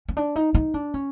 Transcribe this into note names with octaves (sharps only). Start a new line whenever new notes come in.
C#4
D4
D#4
D#4
D4
C#4